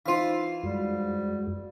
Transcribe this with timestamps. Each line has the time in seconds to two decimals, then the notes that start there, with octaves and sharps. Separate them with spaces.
0.06 E3 D#4 F4 C5 F5
0.63 F#2 G3 G#3 F#4